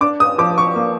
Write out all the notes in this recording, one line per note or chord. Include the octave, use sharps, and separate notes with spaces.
D4 D6
D#6
F3 D6
C#6
A#3